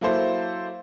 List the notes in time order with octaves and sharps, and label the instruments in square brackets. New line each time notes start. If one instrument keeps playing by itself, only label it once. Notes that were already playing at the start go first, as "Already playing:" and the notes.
[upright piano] F#3 A#3 E4 A4 C5